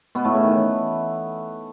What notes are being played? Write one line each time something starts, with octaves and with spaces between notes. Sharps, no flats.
B2 B3
A2 A3
C#3
D#3
E3